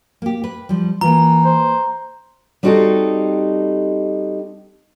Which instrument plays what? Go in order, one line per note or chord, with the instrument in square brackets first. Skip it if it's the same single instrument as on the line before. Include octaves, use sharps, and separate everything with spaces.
[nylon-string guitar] A#3 G4
B4
F3 G3
[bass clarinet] E3 [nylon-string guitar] A#3 F4 [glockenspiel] A#5
[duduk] C5
[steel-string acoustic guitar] G3 C4 D#4 F#4 G4 A4